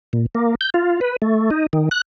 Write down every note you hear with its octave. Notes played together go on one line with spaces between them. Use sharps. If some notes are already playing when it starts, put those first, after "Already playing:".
A#2
A#3
G6
F4
B4
A3
D#4
D#3
F#6